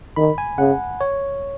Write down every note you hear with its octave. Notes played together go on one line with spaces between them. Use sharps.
D#3 B5
G#5
C#3 F#5
C#5